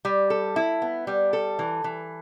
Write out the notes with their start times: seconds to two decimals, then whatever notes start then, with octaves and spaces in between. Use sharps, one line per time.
0.05 G3
0.30 A4
0.56 E4
0.82 B3
1.07 G3
1.33 A4
1.59 E3
1.84 E3